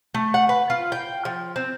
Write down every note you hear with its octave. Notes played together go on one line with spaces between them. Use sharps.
A3
F#5
B4
F4
G5
F3
C4